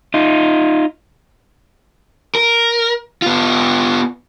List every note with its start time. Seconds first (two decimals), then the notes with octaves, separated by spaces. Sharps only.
0.14 D#4 F4
2.35 A#4
3.22 B3 F4